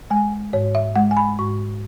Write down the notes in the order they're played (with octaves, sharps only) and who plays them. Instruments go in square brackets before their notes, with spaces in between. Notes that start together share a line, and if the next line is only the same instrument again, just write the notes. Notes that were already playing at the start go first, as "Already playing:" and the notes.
[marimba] G#3 G#5
G#2 C#5
E5
G#3 F#5
G#5
B5
G#2 C#6